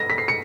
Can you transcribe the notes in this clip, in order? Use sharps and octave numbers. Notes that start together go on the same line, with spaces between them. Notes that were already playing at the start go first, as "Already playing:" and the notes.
Already playing: A#6
B6
C7
C#7